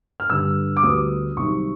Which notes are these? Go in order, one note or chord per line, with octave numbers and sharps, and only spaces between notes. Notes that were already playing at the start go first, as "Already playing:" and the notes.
F6
G2 D3 G3 E6
D6
D2 D3 G3 B3 D#6
C2 C3 D#3 F#3 C#6